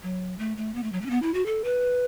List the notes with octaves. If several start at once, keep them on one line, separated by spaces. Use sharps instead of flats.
F#3
A3
A3
B3
A3
F#3
A3
C#4
B3
E4
F#4
A4
B4